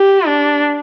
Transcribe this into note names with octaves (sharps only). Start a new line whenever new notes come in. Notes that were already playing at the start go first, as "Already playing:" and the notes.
Already playing: G4
D4